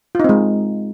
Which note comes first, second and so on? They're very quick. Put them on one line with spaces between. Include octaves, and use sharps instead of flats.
F4 D#4 C4 G#3